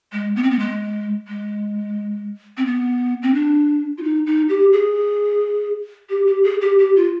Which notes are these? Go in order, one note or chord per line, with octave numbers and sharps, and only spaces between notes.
G#3
B3
C4
B3
G#3
G#3
C4
B3
C4
D4
F4
D#4
D#4
G4
G#4
G4
G4
G#4
G4
G4
F4